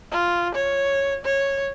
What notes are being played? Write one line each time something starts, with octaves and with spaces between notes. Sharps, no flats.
F4
C#5
C#5